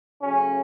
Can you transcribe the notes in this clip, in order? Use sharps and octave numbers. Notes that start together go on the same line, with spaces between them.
C#3 F#3 A3 C#4